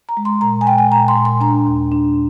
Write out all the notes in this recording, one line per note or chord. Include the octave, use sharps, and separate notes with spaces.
A#5
G#3
C6
A#2 A#5
G#5
G#3 G5
G#5
A#2 A#5
C6
A#2
C6
D4 A#5
D#2
D4